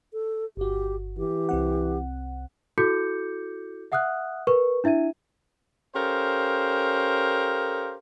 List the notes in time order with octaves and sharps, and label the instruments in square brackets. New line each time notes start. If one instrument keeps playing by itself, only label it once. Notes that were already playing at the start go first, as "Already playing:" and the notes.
[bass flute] A4
[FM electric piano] G1 F#4 [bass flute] G4
[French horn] E3 [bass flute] G4
[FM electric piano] C2 C4 F#5
[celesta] E4 F#4 A4 D6 G6 C#7
E5 F#5 D#6 F6 F#6
A#4 B4 C#6
D4 E4 E5 G#6 D#7
[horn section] C#4 G4 A4 A#4 C5 F5